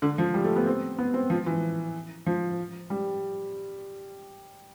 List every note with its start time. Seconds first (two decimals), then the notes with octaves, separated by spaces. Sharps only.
0.02 D3
0.18 F3
0.34 G3
0.44 A3
0.56 B3
0.66 C4
0.99 B3
1.14 C4
1.30 F3
1.46 E3
2.26 F3
2.90 G3